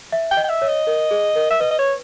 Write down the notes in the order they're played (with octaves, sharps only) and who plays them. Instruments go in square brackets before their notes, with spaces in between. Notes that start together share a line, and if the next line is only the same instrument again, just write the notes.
[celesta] E5
[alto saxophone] G5
[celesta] D#5
[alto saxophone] G5
E5
[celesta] C#5
[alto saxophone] D#5
[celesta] A#4
G#4
A#4
[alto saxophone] E5
[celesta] B4 [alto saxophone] D#5
[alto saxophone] D#5
C#5